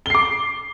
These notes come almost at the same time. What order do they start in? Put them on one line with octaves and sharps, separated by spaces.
G7 C7 D6